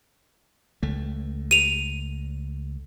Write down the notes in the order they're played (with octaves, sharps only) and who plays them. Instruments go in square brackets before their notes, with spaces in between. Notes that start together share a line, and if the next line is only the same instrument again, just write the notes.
[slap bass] C#2 A3
[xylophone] D#7 F7